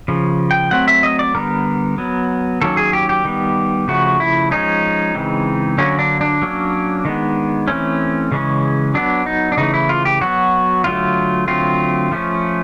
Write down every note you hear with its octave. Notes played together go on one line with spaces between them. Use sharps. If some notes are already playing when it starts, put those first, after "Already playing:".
C#3 F3
G5
F#3 A3 C4 F#5
E5
D#5
D5
D3 G3 B3 A#4
F#3 B3
D#3 F#3 A#3 C#4 A4
G#4
G4
G4
D#3 G3 B3
C#3 F3 A3 F#4
E4
F3 G#3 C#4 D#4
C#3 E3 G#3 C4
D3 F#3 A#3 C#4
D4
D4
F#3 A#3 C#4
D#3 G#3 B3
E3 A3 C4 C#4
C#3 E3 G#3 C#4
F#3 B3 D4
D#4
D4
C#3 E3 A3 D#4
E4
F4
G4
F#3 B3 F#4
D3 F#3 A3 F4
D3 F#3 A3 C4 F4
F3 A3 C#4